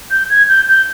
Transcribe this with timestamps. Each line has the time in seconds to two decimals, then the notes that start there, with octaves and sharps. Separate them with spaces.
0.10 G6
0.29 G#6
0.47 G6
0.67 G6